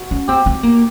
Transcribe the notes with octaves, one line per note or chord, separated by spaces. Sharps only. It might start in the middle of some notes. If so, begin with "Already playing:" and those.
Already playing: F#4
C#4
C4 G4
C4
A#3